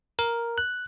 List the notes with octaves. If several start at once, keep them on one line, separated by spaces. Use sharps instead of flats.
A#4
F#6